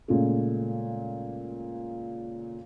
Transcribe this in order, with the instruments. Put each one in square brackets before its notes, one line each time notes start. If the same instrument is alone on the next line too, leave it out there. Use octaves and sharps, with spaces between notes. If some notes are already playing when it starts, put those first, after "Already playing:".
[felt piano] A#2 C#3 G#3 A3